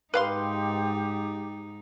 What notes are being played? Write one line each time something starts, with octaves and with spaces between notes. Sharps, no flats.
G#2 D#4 G4 B4 F5 C6